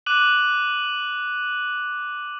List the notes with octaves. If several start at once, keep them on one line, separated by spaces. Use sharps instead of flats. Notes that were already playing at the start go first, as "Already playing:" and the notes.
D6 F#6 D#7 F#7